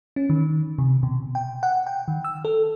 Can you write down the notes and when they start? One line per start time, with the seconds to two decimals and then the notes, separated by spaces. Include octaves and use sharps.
0.16 C#4
0.30 D#3
0.78 C3
1.03 B2
1.35 G5
1.63 F#5
1.87 G5
2.08 D#3
2.25 E6
2.45 A4